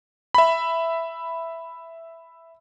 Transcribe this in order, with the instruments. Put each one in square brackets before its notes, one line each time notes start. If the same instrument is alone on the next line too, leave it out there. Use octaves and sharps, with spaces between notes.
[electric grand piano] E5 B5